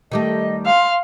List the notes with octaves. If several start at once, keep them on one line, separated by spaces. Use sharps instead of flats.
D#3 G3 A3 D#5
F5 C6